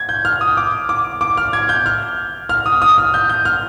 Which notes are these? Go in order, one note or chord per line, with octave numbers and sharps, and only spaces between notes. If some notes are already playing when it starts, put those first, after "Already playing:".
Already playing: G#6
G6
F6
D#6
D6
D6
D6
F6
G#6
G6
F6
F6
D#6
D#6
F6
G6
G6
F6